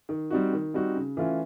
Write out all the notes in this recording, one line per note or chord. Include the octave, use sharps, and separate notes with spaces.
D#3
G3 C4 D#4 F#4
D#3
G3 C4 D#4 F#4
C#3
E3 A3 C#4 F4